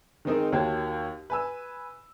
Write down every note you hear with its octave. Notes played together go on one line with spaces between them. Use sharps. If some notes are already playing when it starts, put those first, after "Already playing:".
D#3 G#3 C4 D#4 A#4
D#2 A#3 F#4 C#5 G5 A5
B4 G#5 E6